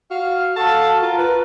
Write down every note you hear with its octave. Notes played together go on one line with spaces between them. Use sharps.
F#4 F5 F6
F#4 A4 F5 A5
F4 A#4
B4